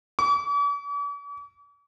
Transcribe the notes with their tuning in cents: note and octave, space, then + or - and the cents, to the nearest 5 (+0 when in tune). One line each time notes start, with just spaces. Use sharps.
D6 -45